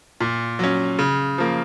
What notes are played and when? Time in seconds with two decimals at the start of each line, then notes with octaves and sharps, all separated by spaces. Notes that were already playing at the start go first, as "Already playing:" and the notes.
0.20 A#2
0.59 F#3 C#4
0.99 C#3
1.38 F3 A#3